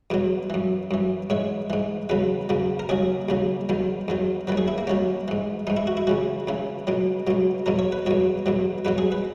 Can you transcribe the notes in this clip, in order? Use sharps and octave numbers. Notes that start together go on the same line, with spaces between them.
E2 B2 F#3
F#2 E3
F#2 E3
G#2 E3 C#5
G#2 E3
E2 C#3 F#3 B4
E2 C#3 F#3
A#4
D#2 C#3 F#3 G#4
D#2 C#3 F#3
E2 D#3 F#3
E2 D#3 F#3
D#2 D#3 F#3 B4
G#4
E4
A#3
D#2 D#3 F#3 C#4
G#2 E3
G#2 E3 D#4
E4
F#4
E4
C#2 C#3 E3 F#4
C#2 C#3 E3
C#2 B2 F#3
C#2 B2 F#3
E2 B2 F#3 A#4
C#5
B4
E2 B2 F#3 C#5
E2 B2 F#3
E2 B2 F#3 B4
G#4
B4